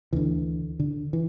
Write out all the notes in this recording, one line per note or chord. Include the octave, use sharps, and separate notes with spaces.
D2 D3 E3
D3
E3